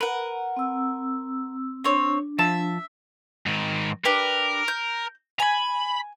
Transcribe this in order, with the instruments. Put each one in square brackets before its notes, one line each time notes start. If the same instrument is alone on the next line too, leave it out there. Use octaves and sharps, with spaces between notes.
[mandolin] A#4 F#5 [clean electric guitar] B4
[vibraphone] C4 E6
[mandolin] C4 C#5 [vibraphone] D4
[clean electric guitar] F3 A5 [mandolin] E5
[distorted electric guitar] G#2 D#3
[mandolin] D4 G4 B4 [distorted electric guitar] A#4
[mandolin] G6
[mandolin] G#5 [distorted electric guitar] A#5 B5